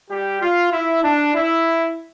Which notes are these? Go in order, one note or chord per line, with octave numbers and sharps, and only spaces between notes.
G3 G4
F4
E4
D4
E4